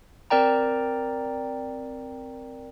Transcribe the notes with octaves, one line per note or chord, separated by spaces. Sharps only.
C4 A#4 D5 G5 A#5